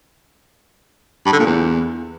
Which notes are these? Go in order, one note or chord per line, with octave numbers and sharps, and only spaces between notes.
G2
D3
A#2
E2